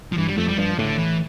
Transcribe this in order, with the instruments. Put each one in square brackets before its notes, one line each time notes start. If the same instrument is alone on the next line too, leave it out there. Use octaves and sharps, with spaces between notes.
[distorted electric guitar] F3
[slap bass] G2 [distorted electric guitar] E3
[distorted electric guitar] G3
[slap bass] F2 [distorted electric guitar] A3
[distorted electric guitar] G3
[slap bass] G2 [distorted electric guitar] F3
[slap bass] A2 [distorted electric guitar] D3
[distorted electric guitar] E3